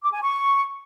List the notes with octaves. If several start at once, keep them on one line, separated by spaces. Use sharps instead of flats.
D6
G#5
C#6